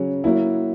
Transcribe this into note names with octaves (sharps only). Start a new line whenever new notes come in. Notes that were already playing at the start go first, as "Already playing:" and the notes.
Already playing: C#3 F#3 C#4
F#3 A#3 E4